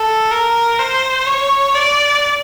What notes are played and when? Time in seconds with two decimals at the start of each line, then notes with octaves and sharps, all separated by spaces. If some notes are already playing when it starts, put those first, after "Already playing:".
Already playing: A4
0.31 A#4
0.79 C5
1.26 C#5
1.75 D5